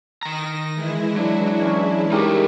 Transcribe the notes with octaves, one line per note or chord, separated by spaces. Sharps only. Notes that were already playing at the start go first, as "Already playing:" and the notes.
D#3 A#5 A#6
E3 G#3 E4
F#3 D4
C#4
G3 D#4 G4 G#4 A#4